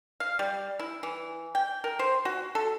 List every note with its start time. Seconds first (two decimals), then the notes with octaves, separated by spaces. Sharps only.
0.20 F5
0.39 G3
0.79 E4
1.03 E3
1.55 G5
1.84 A#4
1.99 C5
2.25 F#4
2.55 A4